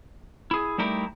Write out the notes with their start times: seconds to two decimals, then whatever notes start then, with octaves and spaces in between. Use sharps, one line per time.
0.51 E4 G#4
0.78 G3 A3 D#4 E4 G4 A#4